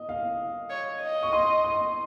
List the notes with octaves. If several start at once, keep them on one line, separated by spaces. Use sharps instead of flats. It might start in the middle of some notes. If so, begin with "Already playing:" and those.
Already playing: D#5
F5
C#5
D#5
C#6
C6
C6